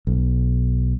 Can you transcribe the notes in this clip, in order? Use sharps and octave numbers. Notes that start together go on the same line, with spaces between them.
B1